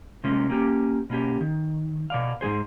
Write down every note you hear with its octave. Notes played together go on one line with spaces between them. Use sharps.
C3 G#3 A#3 C#4
A#3 C#4 G4
B2 A#3 C#4 G4
D#3
B2 D5 F5
G#2 F3 G#4 C5